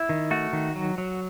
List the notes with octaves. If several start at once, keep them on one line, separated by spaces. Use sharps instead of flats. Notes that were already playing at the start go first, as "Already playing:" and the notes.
Already playing: E4
D#3
A3 F#4
D#3
F#3
F#3